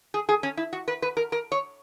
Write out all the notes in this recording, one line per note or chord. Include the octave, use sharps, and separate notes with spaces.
G#4
G#4
C#4
E4
F#4
B4
B4
A#4
A#4
C#5